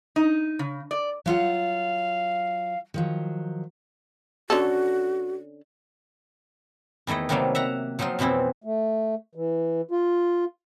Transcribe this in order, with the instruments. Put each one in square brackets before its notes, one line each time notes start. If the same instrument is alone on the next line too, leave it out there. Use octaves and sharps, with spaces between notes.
[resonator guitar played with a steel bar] D#4
C#3
D5
[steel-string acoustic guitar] F#3 F4 F#5 [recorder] F5
[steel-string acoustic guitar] D#3 F3 F#3
[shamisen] D3 C#4 A4 [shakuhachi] F#4
[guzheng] E2 D#3 A3 E4 D#5
C3 D#3 F#3 G3 A3 A#3
E5 F#5 A#5
F3 F#3 C4 D#4 F4
F2 B2 E3 C4 E4
[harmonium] A3
E3
F4